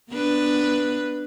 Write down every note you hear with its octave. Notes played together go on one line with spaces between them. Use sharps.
B3 D4 B4